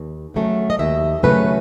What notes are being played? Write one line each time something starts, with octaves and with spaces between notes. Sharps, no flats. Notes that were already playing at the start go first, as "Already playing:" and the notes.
Already playing: D#2
C#3 F#3 A3 C#4
D#5
D#2 E5
C#3 F#3 A3 C#4 B4